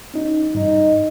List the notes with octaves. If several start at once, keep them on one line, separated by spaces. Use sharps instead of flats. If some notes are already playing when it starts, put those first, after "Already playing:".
C#4 D#4
G2 D#4